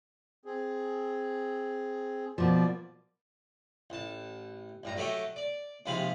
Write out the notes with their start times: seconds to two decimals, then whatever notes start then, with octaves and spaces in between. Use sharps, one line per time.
0.45 C4 G#4
2.38 B2 F3 A#3 D5
3.90 A1 A5
4.83 A1 G2 A#5
4.97 F#3 A3 G4 D#5 E5 G5
5.36 D5
5.86 D#2 C3 F3 G#3 F5 B5